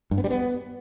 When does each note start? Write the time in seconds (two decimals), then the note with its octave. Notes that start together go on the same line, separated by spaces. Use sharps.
0.11 G2
0.18 B3
0.24 G3
0.30 B3